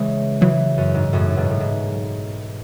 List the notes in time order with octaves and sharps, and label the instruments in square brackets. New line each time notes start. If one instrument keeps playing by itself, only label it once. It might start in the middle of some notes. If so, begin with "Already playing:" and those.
Already playing: [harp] C#3 E3 [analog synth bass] G#3
[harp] C#3 E3 [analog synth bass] F#3
[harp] F#2
G#2
F#2 A2
G#2 B2
A2
G#2